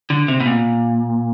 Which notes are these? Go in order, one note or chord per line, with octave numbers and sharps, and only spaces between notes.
D3
C3
B2
A#2